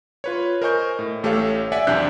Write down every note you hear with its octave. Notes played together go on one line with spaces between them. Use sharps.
F4 B4 C#5
A#4 C5 D#5 G#5 C#6 G6
A2
A1 A3 G4 A4 C#5 F5
D5 E5 F#5 G#5
B1 E2 C3 D4 F#6 G6